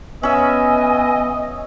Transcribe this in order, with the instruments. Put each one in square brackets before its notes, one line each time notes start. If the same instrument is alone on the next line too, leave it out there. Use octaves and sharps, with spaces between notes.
[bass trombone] B3 [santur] C#4 E5 [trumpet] D#5 [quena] G#5